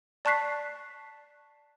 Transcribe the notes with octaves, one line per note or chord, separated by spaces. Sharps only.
D5 A5 C#6 F#6 B6 C7